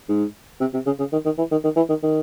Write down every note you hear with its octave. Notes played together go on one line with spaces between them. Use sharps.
G#2
C3
C3
C#3
C#3
D#3
D#3
E3
D#3
D#3
E3
D#3
D#3